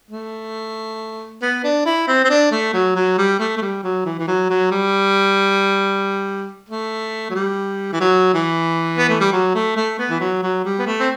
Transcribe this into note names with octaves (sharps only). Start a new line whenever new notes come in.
A3
B3
D4
E4
C4
C4
D4
A3
F#3
F#3
G3
A3
A3
G3
F#3
E3
E3
F#3
F#3
G3
A3
F#3
G3
E3
F#3
E3
B3
A3
G3
F#3
A3
A3
B3
E3
F#3
F#3
G3
B3
A3
C4